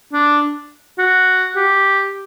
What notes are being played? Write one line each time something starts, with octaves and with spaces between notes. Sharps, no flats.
D4
F#4
G4